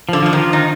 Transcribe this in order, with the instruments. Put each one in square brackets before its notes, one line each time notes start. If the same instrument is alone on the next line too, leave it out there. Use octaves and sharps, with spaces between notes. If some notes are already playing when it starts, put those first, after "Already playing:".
[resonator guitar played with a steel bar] D3 [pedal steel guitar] F3
[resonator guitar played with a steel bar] D3 [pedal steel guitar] F3
[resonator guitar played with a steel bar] D#3 [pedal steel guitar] F4
[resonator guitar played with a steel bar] D#3 [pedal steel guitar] D#4